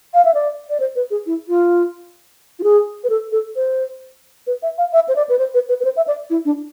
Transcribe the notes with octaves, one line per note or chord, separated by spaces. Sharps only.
F5
E5
D5
D5
C5
B4
G#4
E4
F4
F4
G#4
B4
A4
A4
C5
B4
E5
F5
E5
C5
D5
B4
C5
B4
B4
B4
C5
E5
D5
E4
D4